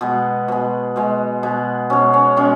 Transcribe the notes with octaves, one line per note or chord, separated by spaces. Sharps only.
B2 G#3 B3
B2 G#3
B2 G#3
B2 G#3
B2 G#3 C#4
C#4
B2 G#3 C#4